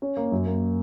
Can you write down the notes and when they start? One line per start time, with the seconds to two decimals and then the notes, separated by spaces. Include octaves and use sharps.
0.02 C#4
0.17 A#3
0.32 F#2
0.47 A#3